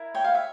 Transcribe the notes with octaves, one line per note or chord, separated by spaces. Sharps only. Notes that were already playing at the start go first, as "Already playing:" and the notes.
Already playing: E4 A#4
C#5 G5
F5
E5